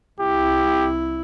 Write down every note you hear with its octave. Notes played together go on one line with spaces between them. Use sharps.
C2 E4 G4